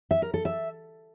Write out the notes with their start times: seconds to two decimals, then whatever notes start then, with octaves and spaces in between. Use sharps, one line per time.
0.11 E5
0.22 A#4
0.34 A4
0.45 E5